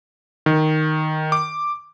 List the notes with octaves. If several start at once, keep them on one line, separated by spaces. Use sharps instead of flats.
D#3
D6